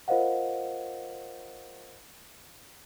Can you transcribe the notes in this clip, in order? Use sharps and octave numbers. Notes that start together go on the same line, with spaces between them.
F4 A#4 C5 D#5 F5 F#5